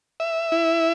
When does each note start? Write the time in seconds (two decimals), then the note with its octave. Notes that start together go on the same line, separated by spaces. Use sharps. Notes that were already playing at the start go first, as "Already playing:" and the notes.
0.20 E5
0.52 E4